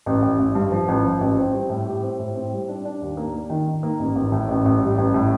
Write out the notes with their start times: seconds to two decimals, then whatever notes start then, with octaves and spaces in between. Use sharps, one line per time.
0.06 A1
0.22 A1
0.39 A1
0.55 G2
0.72 F3
0.88 A1
1.05 F3
1.21 A1
1.38 C4
1.53 G3
1.69 A2
1.86 G4
2.02 C4
2.19 A2
2.35 C4
2.52 G3
2.68 D4
2.85 D4
3.01 D#2
3.17 A#3
3.34 A#3
3.50 D#3
3.67 D#3
3.83 A#3
3.99 A1
4.16 A1
4.32 A2
4.48 A1
4.65 A1
4.82 G3
4.98 A1
5.14 A2